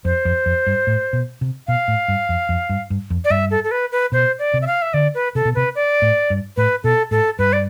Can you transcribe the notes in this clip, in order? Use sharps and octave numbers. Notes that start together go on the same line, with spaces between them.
F2 C5
F2
F2
G2
A2
B2
C3
B2 F5
A2
G2
F2
F2
G2
G2
F2
D5
G2 E5
A4
A4
B4
B4
B2 C5
D5
C3
E5
F5
E5
D3 D5
B4
C3 A4
B2
C3 B4
D5
A2
G2
A2 B4
B2 A4
A2 A4
G2 B4
D5